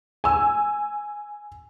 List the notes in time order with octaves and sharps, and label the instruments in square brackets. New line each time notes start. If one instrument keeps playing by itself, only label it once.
[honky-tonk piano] G#5 E6